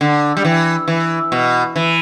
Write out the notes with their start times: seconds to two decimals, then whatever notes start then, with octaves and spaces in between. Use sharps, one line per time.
0.01 D3
0.37 G3
0.45 E3
0.88 E3
1.32 B2
1.76 E3